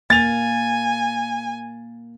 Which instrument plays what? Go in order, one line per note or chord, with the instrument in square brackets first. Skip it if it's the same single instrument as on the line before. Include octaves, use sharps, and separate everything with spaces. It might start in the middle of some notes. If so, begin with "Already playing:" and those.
[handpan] A#3 [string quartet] G#5 [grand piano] A6 F7